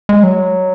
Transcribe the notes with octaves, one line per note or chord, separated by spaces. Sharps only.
G#3
F#3